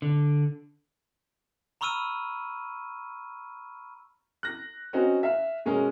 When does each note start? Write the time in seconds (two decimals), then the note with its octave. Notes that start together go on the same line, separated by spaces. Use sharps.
0.02 D3
1.81 A#5 B5 C#6 E6 F6 D#7
4.43 F#6 A#6
4.93 C4 C#4 D#4 F#4
5.23 E5 F5
5.65 B2 G#3 C#4 A#4